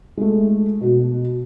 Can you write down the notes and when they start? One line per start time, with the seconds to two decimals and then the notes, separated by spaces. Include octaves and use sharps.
0.17 G#3 A3
0.81 B2 F#4